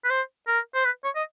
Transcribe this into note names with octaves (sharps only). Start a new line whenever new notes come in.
B4
C5
A#4
C5
B4
C#5
D#5